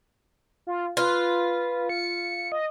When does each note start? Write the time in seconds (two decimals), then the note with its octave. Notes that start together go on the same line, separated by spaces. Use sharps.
0.67 F4
0.97 F4 B4
1.89 C#7
2.52 D#5